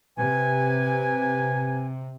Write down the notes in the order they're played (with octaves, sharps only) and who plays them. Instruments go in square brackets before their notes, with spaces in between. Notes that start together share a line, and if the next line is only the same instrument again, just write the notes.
[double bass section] C3 [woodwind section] B4 G#5